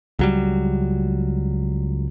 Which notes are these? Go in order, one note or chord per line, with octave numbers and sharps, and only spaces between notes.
C#2 F#3 G3